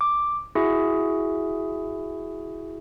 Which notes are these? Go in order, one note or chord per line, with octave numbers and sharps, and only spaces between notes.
D6
E4 F#4 G#4 E5